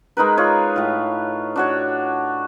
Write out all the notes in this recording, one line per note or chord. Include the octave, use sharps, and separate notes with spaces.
G#3 D#4 A#4 B4
F4 C#5
A2 F4
D4 F#4 C#5